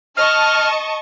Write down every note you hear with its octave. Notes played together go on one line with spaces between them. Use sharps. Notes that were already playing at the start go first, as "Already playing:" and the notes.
D#5 A5 C#6 F6